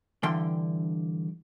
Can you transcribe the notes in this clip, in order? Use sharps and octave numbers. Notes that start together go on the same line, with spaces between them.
G2 D3 E3 G5 C6